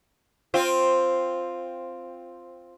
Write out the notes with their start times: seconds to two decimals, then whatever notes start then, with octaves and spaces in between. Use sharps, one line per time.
0.54 C4 F4